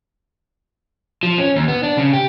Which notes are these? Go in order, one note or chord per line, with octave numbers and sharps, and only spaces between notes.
F3
C#4
D#2
B3
D4
C#3
G4